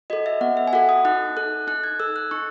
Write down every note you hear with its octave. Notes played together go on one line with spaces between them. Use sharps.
F#4 A4 D#5
E5
B3 F#5
E5
G#5
F#4 A4 F#5
D#6
D#4 F#6
A4 F#6
D#4 F#6
G#6
A4 E6
F#6
D#4 C#6